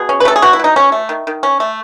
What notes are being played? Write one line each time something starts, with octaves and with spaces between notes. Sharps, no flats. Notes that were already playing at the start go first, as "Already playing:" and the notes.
Already playing: B2 G#4
C#4
B4
A3 A4
G#4
B2 F#4
E4
B2 D#4
C#4
A3
D#3
D#3
C#4
A3